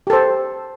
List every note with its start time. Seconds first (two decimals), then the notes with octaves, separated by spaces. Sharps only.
0.07 G4
0.10 A4
0.13 C5